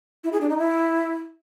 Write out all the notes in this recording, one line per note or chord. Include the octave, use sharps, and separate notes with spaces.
E4
G#4
D4
D#4
E4